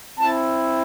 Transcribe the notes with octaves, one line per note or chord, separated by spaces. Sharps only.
C4 E4 A5